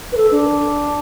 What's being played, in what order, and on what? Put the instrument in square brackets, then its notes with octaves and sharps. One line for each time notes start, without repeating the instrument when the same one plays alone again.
[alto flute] B4
A4
D4